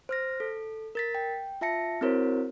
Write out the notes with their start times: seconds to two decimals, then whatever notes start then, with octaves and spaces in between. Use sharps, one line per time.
0.09 C5 F6 A#6
0.40 A4
0.95 A#4 A6 B6
1.15 G5
1.61 F4 E5 A5 A#6 C#7
2.01 C4 E4 F#4 A#4 C5 C#5